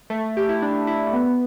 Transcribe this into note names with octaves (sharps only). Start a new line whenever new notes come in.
A3
G4
E4
D4
E4
A3
B3